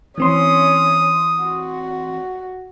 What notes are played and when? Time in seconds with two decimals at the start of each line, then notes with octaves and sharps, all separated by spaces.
0.18 E3 C4 C#4 C6 D#6
1.43 F#4